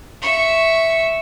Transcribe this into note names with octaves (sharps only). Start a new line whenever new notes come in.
E5 C#6